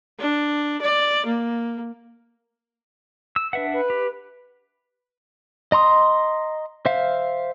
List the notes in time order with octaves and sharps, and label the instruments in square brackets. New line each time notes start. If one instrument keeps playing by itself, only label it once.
[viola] D4
D5
A#3
[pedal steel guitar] E6
[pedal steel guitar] D4 E5 F#5 [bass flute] B4
[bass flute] B4
[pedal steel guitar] G4
D#5 A#5 C6 D#6
C5 E5 F5